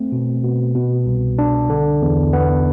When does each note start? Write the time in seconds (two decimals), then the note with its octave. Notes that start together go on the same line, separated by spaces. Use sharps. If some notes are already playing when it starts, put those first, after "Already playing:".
Already playing: A3 C4
0.12 B2
0.44 B2
0.75 B2
1.06 C2
1.38 D4
1.70 D3
2.02 E2
2.33 B3